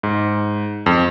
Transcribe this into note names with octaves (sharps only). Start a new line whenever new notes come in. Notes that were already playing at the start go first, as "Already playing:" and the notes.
G#2
F2